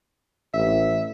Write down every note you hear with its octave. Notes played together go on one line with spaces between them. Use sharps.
A1 E5